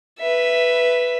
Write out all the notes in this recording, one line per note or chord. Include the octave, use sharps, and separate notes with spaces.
B4 E5